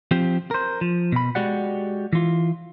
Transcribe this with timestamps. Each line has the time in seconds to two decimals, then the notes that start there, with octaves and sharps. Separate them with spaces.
0.11 F3 C4 G4
0.51 A#4 C5
0.81 F3
1.12 B2 B5
1.35 G#3 F#4 G4 D5 F#5
2.13 E3 F4